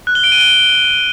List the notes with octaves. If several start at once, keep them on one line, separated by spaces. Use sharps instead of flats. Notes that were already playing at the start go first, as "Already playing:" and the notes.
F#6
G7
D7
D#7
G7